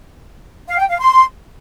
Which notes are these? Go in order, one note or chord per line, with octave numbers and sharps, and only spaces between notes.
F5
G5
F5
C6